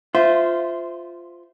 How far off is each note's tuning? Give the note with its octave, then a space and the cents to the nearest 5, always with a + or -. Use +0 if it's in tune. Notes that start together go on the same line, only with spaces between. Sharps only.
F4 +0 C5 -20 E5 +0